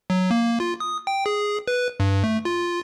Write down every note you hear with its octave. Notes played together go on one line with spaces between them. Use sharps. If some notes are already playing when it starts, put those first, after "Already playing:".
F#3
A#3
F4
D#6
G5
G#4
B4
G2
A3
F4